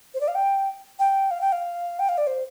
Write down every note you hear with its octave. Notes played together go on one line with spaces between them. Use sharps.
C5
D5
F5
G5
G5
F5
G5
F5
G5
F5
D5
C5